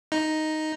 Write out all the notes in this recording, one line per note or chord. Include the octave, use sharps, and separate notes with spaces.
D#4